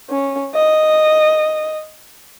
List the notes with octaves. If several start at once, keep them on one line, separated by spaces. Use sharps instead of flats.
C#4
D#5